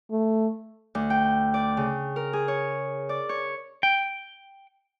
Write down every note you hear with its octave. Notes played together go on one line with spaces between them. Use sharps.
A3
D2
G5
D5
C#3
A#4
G#4
C#5
D5
C#5
G5